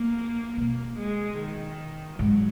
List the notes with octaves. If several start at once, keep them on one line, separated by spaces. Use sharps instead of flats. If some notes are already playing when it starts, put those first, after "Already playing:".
Already playing: A#3
B2 A#3
G#3
D#3
G#2 F#3